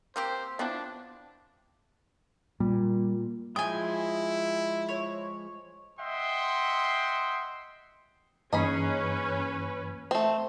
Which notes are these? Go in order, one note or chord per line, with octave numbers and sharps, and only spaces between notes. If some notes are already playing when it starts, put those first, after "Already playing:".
A#3 C4 G4 C5
F3 B3 C4 D4 E4
A#2 G3
F3 G#3 E4 G5 G#5 D#6
C#5
D#5 E5 F#5 G5 C6
G2 E3 A#3 C#4 D#4 G#4 B4 B5
A3 C4